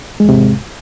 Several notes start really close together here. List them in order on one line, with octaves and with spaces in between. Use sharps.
G#3 E2 C3 G#2